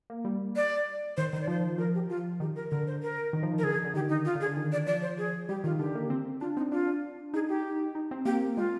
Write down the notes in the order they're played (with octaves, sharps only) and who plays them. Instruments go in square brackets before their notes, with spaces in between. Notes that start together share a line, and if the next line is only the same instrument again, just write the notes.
[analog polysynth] A#3
G3
[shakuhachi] D5
[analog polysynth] D#3 [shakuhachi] C5
[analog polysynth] D#3 [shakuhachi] C5
[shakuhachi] D5
[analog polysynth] F3 [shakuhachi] C5
[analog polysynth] F3 [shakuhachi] A#4
[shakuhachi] G4
F4
[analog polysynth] D#3 [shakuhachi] G4
[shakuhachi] A#4
[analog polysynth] D3 [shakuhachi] A#4
[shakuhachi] C5
A#4
[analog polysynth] D#3
F3
D#3
[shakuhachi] A#4
[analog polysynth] D3 [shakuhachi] G#4
[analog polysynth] D3
[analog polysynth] D#3 [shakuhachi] G4
[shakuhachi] D#4
F4
[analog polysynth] D3
[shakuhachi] G#4
[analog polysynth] D3
D#3
[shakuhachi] D5
[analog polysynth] F3 [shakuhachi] D5
[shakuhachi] C5
G#4
[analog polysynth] G3 [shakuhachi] G4
[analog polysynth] D#3 [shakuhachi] F4
[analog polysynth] D3 [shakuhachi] G4
[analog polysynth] A#3
C4
[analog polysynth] D4 [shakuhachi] F4
[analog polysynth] C4 [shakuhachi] D#4
[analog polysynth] D4 [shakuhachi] F4
[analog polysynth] D#4 [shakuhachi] G#4
[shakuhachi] G4
[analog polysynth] D#4
C4
[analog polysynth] A#3 [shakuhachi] G4
[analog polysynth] G#3 [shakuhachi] F4